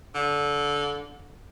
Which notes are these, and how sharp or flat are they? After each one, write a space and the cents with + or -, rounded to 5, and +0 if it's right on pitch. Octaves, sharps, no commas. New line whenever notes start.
D3 -20